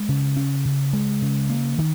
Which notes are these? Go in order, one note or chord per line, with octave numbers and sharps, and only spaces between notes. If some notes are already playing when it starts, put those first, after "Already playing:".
Already playing: G#3
C#3
C#4
C#3
G#3
C#3
A#3
D#3